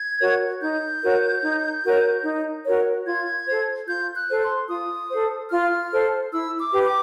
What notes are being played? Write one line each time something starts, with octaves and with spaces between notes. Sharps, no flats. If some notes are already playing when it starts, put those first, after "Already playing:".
Already playing: G#6
F#4 A#4 C#5
D#4 G6
F#4 A#4 C#5
D#4
F#4 A#4 C#5
D#4
F#4 A#4 C#5
F4 G#6
A4 C5
F4 G6
F#6
A4 C5
C6
F4 D#6
A4 C5
F4 F6
A4 C5
E4 E6
D6
G4 B4
D6